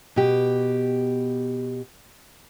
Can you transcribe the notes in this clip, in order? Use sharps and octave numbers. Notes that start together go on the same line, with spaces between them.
B2 G4